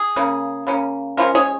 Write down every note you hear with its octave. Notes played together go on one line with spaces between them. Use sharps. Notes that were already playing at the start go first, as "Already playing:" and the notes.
Already playing: G#4
C#3 A#3 C#4
C#3 A#3 C#4
F3 G#3 C#4 F4 A#4
G#4 C#5